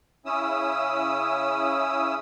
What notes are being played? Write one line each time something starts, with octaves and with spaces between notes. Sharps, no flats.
C#3 C#4 E4 D#6 E6